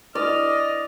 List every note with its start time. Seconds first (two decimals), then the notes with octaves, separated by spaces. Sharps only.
0.15 E4 D5 D#5 F6